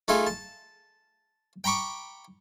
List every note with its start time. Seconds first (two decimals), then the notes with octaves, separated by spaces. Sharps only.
0.08 A3 D#4 F4 G#4 E5
0.27 A5
1.64 G5 A#5 B5 C#6 D6